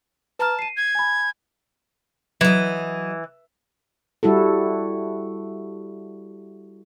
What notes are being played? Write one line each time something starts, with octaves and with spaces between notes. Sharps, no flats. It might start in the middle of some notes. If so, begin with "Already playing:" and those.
B4 A5 A#5 F6
C7 D#7
G#6
G#5 B5
E3 F#3 D#5
G3 E4 F#4 A4